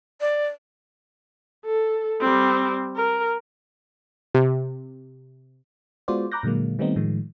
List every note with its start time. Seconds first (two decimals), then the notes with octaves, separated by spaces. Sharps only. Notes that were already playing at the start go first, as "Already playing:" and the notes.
0.21 D5
1.65 A4
2.20 G3 C4
2.96 A#4
4.35 C3
6.08 G#3 B3 F4 F#4 C5 D5
6.32 A#5 B5 D6 F#6 G6 A#6
6.43 A#2 D3 F#3 G#3 A#3
6.79 D#3 G3 A3 B3 C4 D#4
6.96 A2 D#3 F3 G#3